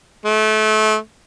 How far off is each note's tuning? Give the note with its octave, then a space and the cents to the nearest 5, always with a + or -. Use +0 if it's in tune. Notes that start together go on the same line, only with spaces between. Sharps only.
A3 -30